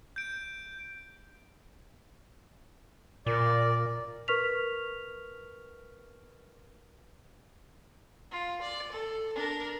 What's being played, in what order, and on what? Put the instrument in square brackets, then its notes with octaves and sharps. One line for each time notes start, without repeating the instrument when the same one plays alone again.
[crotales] G6 D7
[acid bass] A#2 [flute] A#4 [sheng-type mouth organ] D5
[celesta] A#4 B4 C#6 F6 B6 F7
[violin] F4
D5
A4
D4 A#4